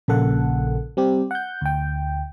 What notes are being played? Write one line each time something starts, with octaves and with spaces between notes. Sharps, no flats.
A#1 C#3 A#3 A4 F#5
G3 C4 G4
F#5 G6
D2 G5